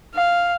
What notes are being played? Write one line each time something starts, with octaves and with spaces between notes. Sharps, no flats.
F5